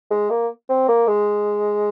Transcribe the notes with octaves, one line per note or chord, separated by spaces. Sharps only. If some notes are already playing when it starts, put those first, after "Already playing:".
G#3
A#3
C4
A#3
G#3